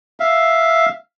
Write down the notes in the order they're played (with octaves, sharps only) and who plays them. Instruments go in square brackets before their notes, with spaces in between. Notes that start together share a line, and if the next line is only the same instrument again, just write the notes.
[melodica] E5 F5